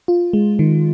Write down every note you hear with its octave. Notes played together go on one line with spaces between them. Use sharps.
F4
G#3
D#3